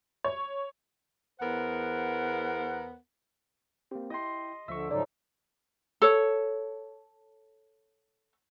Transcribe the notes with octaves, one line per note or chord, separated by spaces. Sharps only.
C#5
E2 B3 A#4 C5 F#5
A#3 C4 G4
E4 D#5 G5 C6
D2 D3 F3 E5 C#6
G#2 C#3 F3 F#3 D#4 A4 D5
A4 C#5